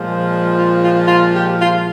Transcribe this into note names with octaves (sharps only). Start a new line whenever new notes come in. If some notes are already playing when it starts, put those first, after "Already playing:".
Already playing: A#2 F3 G#3
F4
F4
F4
G4
F4